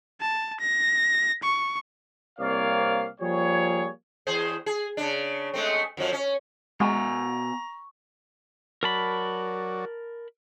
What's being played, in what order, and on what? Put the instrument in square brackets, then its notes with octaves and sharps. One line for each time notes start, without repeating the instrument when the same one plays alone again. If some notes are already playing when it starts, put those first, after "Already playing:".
[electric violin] A5
A#6
C#6
[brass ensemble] C2 A#3 C4 C#5 D5 F5
F3 G3 A#3 G#4 C#5
[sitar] E2 G#4 C5
G#4
C#3 D4
G#3 A3 C4
F2 F3 F#3
C#4
[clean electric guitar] B2 F#5 G#5 [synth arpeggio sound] G#3 [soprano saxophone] A#5 [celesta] C#6
[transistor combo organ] F#3 F#4 D5 [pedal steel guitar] A#4 A5 B5